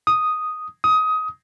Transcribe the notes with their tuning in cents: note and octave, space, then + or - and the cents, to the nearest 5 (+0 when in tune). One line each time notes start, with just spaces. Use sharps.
D#6 +0
D#6 +20